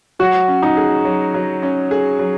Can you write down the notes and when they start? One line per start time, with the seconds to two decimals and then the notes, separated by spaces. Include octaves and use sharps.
0.19 F#3 F#4
0.48 C#4
0.63 D#4
0.77 G#4
1.05 F#3
1.34 F#3
1.63 C#4
1.91 G#4
2.19 F#3